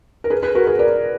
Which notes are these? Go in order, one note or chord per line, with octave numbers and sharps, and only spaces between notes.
A#4
G#4 B4
G#4 B4
F#4 A#4
G#4 B4
A#4 D5